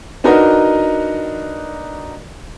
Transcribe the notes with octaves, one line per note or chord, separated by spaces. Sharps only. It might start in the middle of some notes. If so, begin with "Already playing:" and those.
D4 D#4 F#4 A#4 B4 D#5